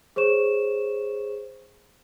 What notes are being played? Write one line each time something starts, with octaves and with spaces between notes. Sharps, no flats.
G#4 C5 C#5 C#6 E7